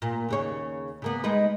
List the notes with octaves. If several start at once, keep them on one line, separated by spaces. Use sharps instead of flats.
A#2
D#2 C#3 C#5
C#3 A#3 B3
G#3 D#4 B4